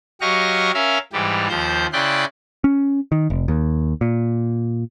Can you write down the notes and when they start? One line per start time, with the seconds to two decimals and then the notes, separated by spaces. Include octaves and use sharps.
0.21 F#3 G4 D#5 F5 C#6 A#6
0.74 C#4 A#4 E5 F5
1.13 G#2 E3 G3 G4
1.49 D#2 F3 C5 G6
1.93 C#3 E4 D5 G5 C6 F#6
2.64 C#4
3.12 D#3
3.30 F1
3.48 D#2
4.01 A#2